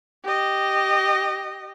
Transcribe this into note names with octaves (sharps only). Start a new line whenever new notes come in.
G4 D#5